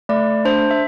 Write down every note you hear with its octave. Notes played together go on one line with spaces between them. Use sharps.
A3 D5
D4 C5
E5